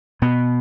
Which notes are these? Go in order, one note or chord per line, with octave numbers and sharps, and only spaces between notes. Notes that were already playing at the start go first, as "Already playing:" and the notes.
B2 B3